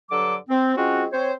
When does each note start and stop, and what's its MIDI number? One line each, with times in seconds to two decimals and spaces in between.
0.12 0.36 43
0.12 0.36 50
0.12 0.36 54
0.12 0.36 69
0.12 0.36 86
0.49 0.76 60
0.77 1.06 56
0.77 1.06 60
0.77 1.06 61
0.77 1.06 65
0.77 1.06 66
1.13 1.33 60
1.13 1.33 72
1.13 1.33 73